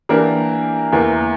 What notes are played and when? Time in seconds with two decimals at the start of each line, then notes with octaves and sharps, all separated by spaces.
0.09 E3 A#3 D4 G4 A#4
0.92 E2 E3 A#3